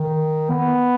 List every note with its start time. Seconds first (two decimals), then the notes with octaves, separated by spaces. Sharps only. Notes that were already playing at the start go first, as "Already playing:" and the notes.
Already playing: D#3
0.50 B3